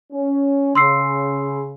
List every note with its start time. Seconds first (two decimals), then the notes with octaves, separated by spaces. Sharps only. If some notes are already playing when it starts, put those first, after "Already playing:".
0.12 C#4
0.75 C#3 C6 E6 C7